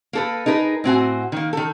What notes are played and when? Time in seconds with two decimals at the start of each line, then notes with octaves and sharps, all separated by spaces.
0.13 A#3 A4 B4
0.46 D#4 G#4 A#4 B4
0.84 A2 C4 F#4 G#5
1.32 D#3 A#3
1.53 D#3 A4